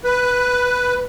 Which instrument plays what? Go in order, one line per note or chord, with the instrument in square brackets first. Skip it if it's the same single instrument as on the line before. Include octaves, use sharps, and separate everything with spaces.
[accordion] B4